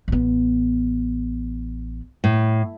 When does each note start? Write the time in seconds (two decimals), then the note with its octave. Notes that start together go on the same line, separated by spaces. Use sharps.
0.08 A1 B3
2.24 A2